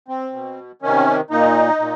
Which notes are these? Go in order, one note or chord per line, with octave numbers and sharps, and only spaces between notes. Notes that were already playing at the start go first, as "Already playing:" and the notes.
C4
B2
C3 D#3 C#4
A#2 D#4
A#2